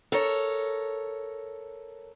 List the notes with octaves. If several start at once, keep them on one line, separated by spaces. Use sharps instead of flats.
A4 A#4 C#5